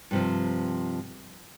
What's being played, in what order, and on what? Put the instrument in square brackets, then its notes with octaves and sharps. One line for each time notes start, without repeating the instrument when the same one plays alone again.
[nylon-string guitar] G2 C3 F3